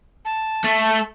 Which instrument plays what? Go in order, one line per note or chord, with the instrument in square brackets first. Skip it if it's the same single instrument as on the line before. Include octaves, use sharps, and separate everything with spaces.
[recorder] A5
[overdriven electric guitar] A3